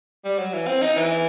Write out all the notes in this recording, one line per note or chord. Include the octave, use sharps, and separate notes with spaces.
G3
F#3
E3
C4
D#4
E3